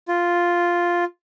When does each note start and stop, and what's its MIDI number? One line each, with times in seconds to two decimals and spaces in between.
0.08 1.04 65